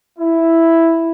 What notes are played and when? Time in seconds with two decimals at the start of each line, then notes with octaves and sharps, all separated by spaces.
0.18 E4